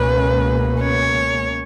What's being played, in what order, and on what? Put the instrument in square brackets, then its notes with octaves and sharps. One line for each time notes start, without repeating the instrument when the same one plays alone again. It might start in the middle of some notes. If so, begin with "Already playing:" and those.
Already playing: [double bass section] C#2 B2 A#3 C#4 [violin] B4
[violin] C#5